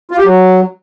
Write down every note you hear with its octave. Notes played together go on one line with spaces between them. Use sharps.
F4
G4
F#3